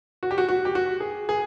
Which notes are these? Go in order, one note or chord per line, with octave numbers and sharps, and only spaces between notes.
F#4
G4
F#4
F#4
G4
F#4
G#4
G#4